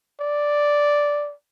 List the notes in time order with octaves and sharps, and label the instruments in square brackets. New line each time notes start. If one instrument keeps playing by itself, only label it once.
[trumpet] D5